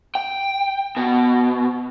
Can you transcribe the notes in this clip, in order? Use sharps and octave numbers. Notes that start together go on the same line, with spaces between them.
G5
B2